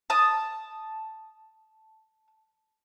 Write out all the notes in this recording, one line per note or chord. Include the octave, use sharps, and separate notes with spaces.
A5 D#6